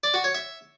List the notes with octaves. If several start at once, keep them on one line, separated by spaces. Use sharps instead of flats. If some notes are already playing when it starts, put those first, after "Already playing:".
D5
F#4
C#5
E5